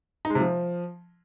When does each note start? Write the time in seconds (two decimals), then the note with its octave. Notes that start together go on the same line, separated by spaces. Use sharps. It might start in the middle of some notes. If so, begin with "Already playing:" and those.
0.25 D#4
0.30 G#3
0.35 C3
0.40 F3